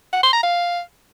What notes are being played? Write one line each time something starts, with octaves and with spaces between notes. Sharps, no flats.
F#5
C6
A#5
F5